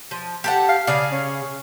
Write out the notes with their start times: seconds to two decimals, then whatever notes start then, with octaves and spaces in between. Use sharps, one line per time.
0.11 F3
0.44 G4 A4 F#5
0.69 F5
0.87 C#3 G#4 D5 F5
1.12 C#4